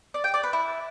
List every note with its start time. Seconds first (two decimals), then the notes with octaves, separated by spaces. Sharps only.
0.14 D5
0.24 G5
0.34 D5
0.43 B4
0.53 E4